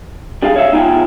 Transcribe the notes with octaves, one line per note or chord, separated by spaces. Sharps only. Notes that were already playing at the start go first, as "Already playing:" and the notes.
G3 D4 G#4 F5
C#5 D5 E5 F5
B3 D#4 F4 G5 G#5